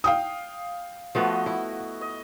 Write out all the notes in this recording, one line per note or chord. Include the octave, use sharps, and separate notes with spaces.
F5 G5 D#6
F3 A3 B3 F#4 D#5
E4
D#5